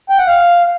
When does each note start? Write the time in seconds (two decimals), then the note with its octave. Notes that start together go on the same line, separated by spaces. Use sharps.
0.10 G5
0.18 F#5
0.27 F5